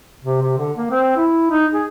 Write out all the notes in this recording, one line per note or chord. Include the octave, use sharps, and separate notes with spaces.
C3
C3
D3
A#3
C4
E4
D#4
G#4